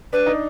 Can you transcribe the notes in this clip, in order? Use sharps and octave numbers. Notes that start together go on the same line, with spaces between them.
D4 B4
D#4